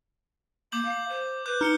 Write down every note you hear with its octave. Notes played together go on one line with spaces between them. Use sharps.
A#3 D6 G6 F#7
F5
C5
B4 D6 F#6 G6
D#4 F6 C#7 G7